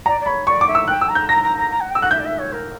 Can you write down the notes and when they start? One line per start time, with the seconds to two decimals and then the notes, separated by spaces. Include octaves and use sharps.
0.06 D5 A#5
0.20 D5
0.26 C#5 B5
0.47 D5 C#6
0.61 D6
0.67 E5
0.75 E6
0.88 G5 F#6
1.01 E6
1.08 A#5
1.15 G6
1.29 A#5 A#6
1.43 A#5
1.57 A#5
1.70 A#5
1.80 F#5
1.90 G5 E6
2.01 F#5 F#6
2.11 E5 G6
2.19 D5
2.25 E5
2.38 C#5
2.52 A#4